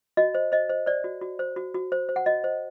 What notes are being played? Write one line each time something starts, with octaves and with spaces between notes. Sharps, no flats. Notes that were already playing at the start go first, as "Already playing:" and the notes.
F#4 D#5
C5
C5 D#5
C5
C5 D5
F#4
F#4
C5
F#4
F#4
C5
C5
F#5
F#4 D#5
C5